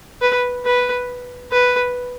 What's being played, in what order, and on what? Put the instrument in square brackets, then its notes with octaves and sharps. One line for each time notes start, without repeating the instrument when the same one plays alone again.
[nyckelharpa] B4
B4
B4